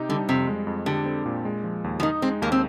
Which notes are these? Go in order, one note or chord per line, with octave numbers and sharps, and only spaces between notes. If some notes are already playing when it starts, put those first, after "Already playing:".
Already playing: C3 D#4 G4
D3 G3
F2 C3
G#3
F2
D3 G4
C4
A#2
G#3
F3
D#2
F3
D#3 D#4
G#3 C4
D#2 A#3
C4